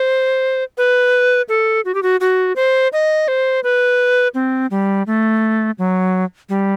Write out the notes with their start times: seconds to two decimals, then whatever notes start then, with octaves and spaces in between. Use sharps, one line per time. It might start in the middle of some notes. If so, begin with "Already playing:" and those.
Already playing: C5
0.78 B4
1.49 A4
1.85 F#4
1.95 G4
2.03 F#4
2.20 F#4
2.56 C5
2.93 D#5
3.28 C5
3.64 B4
4.34 C4
4.71 G3
5.07 A3
5.78 F#3
6.49 G3